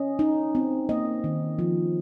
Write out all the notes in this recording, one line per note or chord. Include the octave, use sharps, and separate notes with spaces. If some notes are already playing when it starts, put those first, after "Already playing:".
Already playing: C#4 D#5
D#4
C4
A#3 D#5
D#3
F3